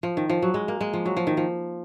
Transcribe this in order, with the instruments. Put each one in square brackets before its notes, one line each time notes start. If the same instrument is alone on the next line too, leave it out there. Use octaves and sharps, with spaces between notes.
[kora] F3
D#3
F3
F#3
G#3
A#3
G#3
F3
F#3
F3
D#3
F3